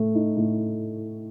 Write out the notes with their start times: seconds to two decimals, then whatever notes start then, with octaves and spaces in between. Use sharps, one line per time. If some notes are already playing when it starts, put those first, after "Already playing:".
Already playing: A2 A3
0.15 D#4
0.37 A2